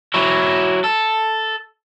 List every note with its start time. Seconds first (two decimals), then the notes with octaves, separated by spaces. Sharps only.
0.14 F#3 E4
0.84 A4